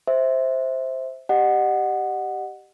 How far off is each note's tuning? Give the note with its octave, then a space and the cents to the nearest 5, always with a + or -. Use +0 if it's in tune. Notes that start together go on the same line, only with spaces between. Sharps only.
C5 +0 E5 -15
G4 -5 D#5 -40 F#5 +0